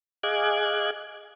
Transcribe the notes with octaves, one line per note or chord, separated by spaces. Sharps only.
G#4 D#5 F5 D6 F#6 G#6